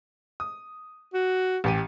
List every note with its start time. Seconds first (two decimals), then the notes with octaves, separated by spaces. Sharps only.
0.40 D#6
1.14 F#4
1.64 A1 G4 D#7